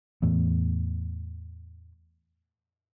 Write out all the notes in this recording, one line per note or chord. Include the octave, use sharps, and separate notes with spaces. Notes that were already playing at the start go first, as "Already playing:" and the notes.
E2 A2